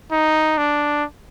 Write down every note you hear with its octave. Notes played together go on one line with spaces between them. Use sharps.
D#4
D4